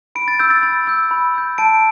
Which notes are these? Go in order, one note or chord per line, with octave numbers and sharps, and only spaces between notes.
B5 D7
A6
E6 G6
A6
B5 A6
E6 G6
B5
E6 G6
A5 D7